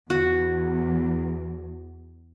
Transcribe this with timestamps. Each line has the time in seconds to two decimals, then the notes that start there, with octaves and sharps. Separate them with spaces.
0.10 E2 F#4